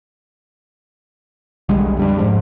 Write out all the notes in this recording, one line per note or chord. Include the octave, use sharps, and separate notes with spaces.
B1 D3 G3 G#3
F2 G3 D4
G#2 F3 G#3